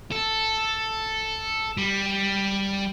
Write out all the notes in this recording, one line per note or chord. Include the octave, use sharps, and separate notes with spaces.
A4
G3